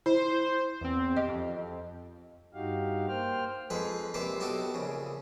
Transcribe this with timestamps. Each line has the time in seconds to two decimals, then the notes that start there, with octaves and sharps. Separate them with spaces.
0.06 E4 C5
0.81 E2 C4
1.17 G4 D#5
1.28 F2
2.54 G2 D#4 F#4 G4 F5
3.08 A#3 C5 G5 F6
3.70 F2 F3 G#3 B4 B5
4.14 A#1 C3 B4 C5 D6
4.40 B1 D#4 F#4 G4 A4
4.74 A#1 C#3